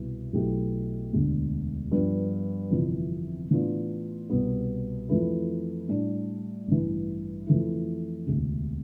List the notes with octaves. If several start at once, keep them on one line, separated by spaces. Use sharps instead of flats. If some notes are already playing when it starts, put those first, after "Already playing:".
Already playing: C2 B2 B3 E4
B1 B2 A3 E4 G4
E1 D2 D3
G2 F3 B3
G1 F2 C3 E3
A2 E3 B3 D4 F4
C2 B2 G3 B3
F2 E3 A3 E4 B4
A2 G3 D4
A1 G2 E3
F2 E3 A3 E4
E1 D2 C3